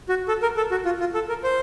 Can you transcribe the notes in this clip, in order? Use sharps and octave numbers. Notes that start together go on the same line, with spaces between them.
F#4
A4
A#4
A4
F#4
F4
F4
A4
A#4
C5